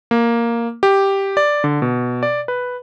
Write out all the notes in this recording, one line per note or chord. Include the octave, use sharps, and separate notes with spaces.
A#3
G4
D5
D3
B2
D5
B4